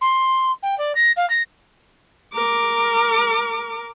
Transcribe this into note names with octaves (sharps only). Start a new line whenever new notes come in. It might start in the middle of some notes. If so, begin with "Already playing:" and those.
C6
G5
D5
A#6
F5
A#6
A#4 D6